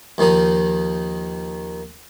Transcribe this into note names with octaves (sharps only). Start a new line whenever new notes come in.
D#2 D#3 F3 D#4 D#6